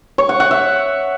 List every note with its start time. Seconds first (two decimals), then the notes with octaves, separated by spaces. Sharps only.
0.18 C#5
0.29 F#5
0.40 F#5
0.51 E5